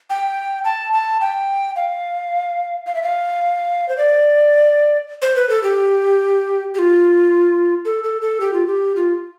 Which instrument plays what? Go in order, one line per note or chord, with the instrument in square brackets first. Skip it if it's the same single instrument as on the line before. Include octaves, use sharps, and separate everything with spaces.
[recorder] G5
A5
A5
G5
F5
F5
E5
F5
C5
D5
C5
B4
A4
G4
G4
F4
A4
A4
A4
G4
F4
G4
F4